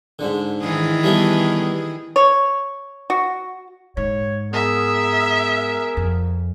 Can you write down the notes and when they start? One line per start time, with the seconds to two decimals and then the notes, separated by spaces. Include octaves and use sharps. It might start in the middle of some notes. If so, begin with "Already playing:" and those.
0.19 G#2 D3
0.62 D#3 E3 G#4
1.04 G3 A3 B3
2.16 C#5
3.10 F#4
3.97 G#2 C#5
4.53 B3 G#4 A#4 E5
5.97 F2